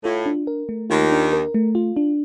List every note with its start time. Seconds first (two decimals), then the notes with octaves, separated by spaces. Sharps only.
0.04 A2 F4
0.26 D4
0.47 A#4
0.69 A3
0.90 D#2 D#3 F4
1.12 D4
1.33 A#4
1.54 A3
1.75 F4
1.96 D4